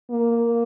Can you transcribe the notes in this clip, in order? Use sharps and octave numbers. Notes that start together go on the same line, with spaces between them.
A#3